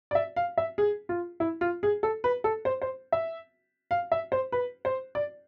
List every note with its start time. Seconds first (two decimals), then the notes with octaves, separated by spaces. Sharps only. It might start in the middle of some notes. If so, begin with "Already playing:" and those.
0.11 D5
0.15 E5
0.36 F5
0.58 E5
0.78 G#4
1.09 F4
1.40 E4
1.61 F4
1.83 G#4
2.03 A4
2.24 B4
2.44 A4
2.65 C5
2.82 C5
3.12 E5
3.91 F5
4.12 E5
4.32 C5
4.52 B4
4.85 C5
5.15 D5